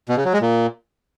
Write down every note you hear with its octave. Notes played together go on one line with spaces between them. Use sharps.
B2
C#3
F#3
G#3
A#2